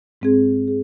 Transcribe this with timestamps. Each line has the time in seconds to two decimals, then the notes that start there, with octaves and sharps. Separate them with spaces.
0.21 G#2 G#3 C4 G#4
0.68 G#4